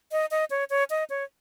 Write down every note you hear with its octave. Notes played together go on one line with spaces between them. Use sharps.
D#5
D#5
C#5
C#5
D#5
C#5